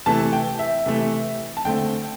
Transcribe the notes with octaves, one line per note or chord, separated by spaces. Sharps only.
C3 E3 A3 A5
G5
E5
C3 E3 A3
A5
D3 A3 C4 G5